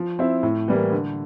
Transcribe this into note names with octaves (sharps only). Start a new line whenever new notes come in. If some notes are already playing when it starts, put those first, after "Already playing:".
Already playing: F3
C4 E4
A2
E3 G3 A#3
D3